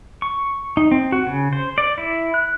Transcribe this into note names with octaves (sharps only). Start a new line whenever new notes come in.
C#6
D#4
C4
F#4
C#3
C5
D5
E4
F#6